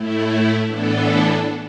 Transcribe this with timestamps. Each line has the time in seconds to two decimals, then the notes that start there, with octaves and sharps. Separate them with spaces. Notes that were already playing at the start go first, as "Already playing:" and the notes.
Already playing: A2 A3 E4
0.66 A2 E3 B3 D4 A4